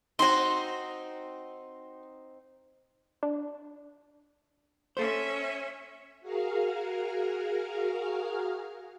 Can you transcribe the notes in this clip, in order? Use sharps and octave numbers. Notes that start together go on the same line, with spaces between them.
C4 D#4 F#4 C6
D4
C#4 A4 C5 E5
F#4 G#4 A#4 F5 F6